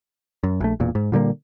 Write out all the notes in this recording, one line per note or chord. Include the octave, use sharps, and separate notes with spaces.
F#2
A#1 A3
E1 E2 A#2
G#2
A#2 D3 G3 A#3